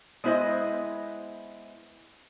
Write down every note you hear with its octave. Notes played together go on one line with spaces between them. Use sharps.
G#3 B3 E4 C5 D#5